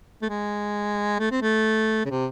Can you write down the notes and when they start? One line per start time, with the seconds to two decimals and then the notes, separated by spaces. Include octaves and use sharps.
0.22 A3
0.29 G#3
1.19 A3
1.31 C4
1.42 A3
2.05 C#3
2.10 C3